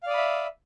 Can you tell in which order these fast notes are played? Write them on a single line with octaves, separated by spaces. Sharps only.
F5 D5 D#6 B5 E5